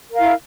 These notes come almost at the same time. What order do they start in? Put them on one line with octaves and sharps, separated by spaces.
A#4 F5 E4